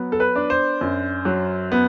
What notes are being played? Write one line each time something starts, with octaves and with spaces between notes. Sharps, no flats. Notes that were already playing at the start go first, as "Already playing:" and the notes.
Already playing: F#3 B3
A4
B4
D4
C5
F#2
F#3
B3